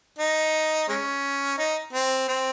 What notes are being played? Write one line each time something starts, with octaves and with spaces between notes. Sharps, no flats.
D#4
G#3 C#4
D#4
C4
C4